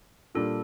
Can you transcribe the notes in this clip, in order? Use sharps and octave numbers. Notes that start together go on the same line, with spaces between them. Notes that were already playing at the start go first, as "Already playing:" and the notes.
A#2 G3 D4 A4